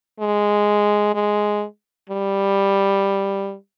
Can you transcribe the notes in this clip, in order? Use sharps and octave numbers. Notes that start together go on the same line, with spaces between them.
G#3
G#3
G3